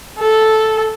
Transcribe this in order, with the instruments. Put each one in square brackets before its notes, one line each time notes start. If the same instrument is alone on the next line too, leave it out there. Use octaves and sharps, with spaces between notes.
[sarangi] A4